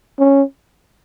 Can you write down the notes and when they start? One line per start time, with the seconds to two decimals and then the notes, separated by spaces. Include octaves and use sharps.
0.19 C#4